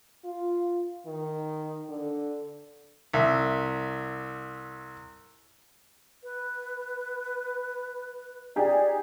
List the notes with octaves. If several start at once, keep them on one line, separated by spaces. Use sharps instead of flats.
F4
D#3
D3
C2 E5
B4
D#4 G4 G#4 D5